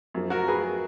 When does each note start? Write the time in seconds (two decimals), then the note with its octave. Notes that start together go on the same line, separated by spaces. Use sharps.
0.15 F#2 F3
0.30 F#4 A#4
0.48 G#4 B4